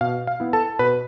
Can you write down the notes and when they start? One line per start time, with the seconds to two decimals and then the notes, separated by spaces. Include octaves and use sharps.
0.01 B2 F5
0.27 F5
0.40 B3 E4
0.53 A4 A5
0.79 B2 B4 B5